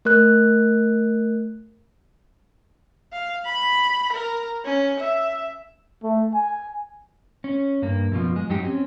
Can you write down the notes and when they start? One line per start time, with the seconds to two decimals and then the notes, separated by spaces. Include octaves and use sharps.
0.05 A3 A#4 F#6
3.12 F5
3.45 B5
4.13 A#4
4.65 C#4
5.00 E5
6.03 A3
6.34 G#5
7.44 C#4
7.82 G2 A#3
8.12 F#2 B2 F3
8.36 G#3
8.49 F#2 F#3 D#4 G4
8.63 C4 C#4